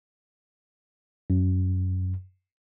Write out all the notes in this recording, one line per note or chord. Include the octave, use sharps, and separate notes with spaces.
F#2